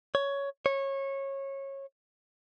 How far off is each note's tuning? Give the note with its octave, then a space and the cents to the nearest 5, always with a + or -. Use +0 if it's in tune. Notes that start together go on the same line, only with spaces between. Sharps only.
C#5 +10
C#5 -20